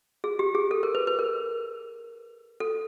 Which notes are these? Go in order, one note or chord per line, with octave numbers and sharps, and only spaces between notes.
G#4
G4
G#4
A4
A#4
B4
B4
A#4
A4